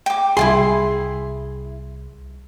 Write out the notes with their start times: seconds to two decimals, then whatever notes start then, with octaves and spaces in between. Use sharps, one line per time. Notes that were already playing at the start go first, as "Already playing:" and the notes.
0.06 G5 D6
0.37 C2 C3 G3 E4 F4 G#4 C6